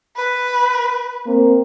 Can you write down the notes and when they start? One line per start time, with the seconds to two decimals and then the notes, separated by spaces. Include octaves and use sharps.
0.16 B4
1.27 A#3 C4